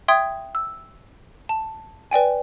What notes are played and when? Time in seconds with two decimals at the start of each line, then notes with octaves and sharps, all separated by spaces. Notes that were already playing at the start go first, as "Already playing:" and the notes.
0.08 E5 G5 C6 D#6 G#6
0.55 E6
1.49 A5
2.11 B4 D5 G5 G#5